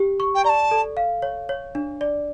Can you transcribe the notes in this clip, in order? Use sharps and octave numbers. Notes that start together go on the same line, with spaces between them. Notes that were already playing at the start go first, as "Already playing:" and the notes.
Already playing: G4
C#6
G5
D5 A5 A#5
A4
F5
C#5
C#5
D4
D5